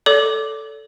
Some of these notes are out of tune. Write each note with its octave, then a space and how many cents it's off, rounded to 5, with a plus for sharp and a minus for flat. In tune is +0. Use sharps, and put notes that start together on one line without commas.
A4 +0 D5 -45 D6 +0